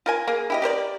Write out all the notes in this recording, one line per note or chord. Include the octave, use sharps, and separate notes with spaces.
F4 A#4 G#5
A#3 G#4
E4 G4 D#5
G4 A#4 C5 D5